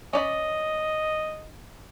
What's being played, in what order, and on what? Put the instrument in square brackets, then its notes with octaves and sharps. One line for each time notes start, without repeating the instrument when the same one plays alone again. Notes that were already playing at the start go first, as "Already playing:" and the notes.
[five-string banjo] C#4 D5 B5 [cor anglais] D#5